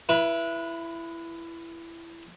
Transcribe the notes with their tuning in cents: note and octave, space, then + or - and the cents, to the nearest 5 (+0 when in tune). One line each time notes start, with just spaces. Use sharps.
E4 +20 B4 -25